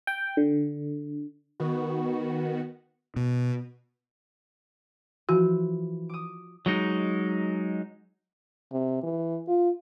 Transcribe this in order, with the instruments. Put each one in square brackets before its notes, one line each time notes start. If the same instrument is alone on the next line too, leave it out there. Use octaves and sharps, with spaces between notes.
[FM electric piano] G5
D3
[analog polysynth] D#3 B3 F#4
[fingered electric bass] B2
[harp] E3 F3 [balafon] F#4
[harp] D6 D#6
[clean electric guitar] F#3 G#3 D#4
[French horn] C3
E3
F4